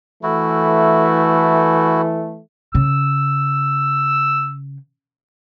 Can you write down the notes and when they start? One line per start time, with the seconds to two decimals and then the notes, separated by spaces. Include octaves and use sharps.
0.23 E3 A3 E4 F#4
2.75 C#3 E6